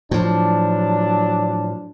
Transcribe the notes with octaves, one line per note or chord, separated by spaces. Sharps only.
A2 F3 F#3 D4